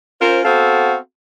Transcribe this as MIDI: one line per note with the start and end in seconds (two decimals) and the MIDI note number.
0.21 0.40 61
0.21 0.40 65
0.21 0.40 70
0.21 0.40 72
0.45 0.95 59
0.45 0.95 60
0.45 0.95 66
0.45 0.95 69
0.45 0.95 77